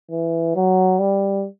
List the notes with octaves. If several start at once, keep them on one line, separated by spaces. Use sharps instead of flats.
E3
F#3
G3